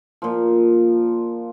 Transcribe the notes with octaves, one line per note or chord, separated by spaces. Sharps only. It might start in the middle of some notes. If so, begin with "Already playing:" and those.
A#2 F3